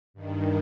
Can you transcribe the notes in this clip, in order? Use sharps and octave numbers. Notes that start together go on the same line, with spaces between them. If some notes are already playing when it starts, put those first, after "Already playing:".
G2 D#3